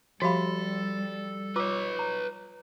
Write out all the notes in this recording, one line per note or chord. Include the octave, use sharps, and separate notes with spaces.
F3 G3 F#4 G4 A4 E5 F5 B5
F4 B4 C#5 D6 E6
A#5